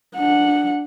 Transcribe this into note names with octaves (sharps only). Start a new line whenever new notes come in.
D4 F#5